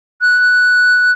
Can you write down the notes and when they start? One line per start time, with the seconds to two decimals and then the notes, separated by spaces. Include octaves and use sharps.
0.22 F#6